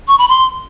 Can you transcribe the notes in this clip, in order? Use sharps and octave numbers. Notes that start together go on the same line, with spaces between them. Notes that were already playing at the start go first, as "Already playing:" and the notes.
C#6
B5
C6